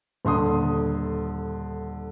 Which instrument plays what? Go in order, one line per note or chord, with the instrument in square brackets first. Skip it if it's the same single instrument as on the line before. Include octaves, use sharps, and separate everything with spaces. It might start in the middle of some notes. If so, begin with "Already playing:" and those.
[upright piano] D#1 D3 C6 D#6